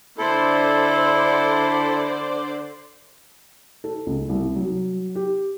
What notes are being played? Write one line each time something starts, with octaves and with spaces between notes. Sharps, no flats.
D3 E4 A4 C5 D5
A4
C#2
C2
F#3
G4